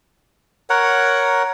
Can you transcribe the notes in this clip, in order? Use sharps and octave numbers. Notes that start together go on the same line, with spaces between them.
A#4 C#5 F#5